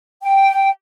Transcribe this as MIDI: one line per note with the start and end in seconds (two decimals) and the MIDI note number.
0.22 0.68 79